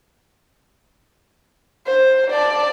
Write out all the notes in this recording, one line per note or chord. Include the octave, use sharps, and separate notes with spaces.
C5
D5 A5